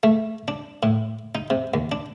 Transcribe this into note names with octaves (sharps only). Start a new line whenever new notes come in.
A3
D4
A2
D#4
C3
D#2
D4